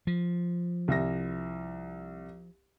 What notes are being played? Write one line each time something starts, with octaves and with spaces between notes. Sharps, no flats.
F3
C2 E5 A#6